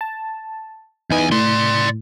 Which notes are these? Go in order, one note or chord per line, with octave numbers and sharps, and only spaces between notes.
A5
E2 D#4 B4 D#5 G#5
A2 D5 C6